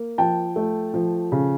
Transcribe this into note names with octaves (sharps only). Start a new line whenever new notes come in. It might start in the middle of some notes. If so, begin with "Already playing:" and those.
Already playing: A#3
F3 G5 A5
A3
F3
C#3